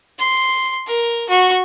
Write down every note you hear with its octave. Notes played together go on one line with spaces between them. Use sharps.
C6
A#4
F#4 C#6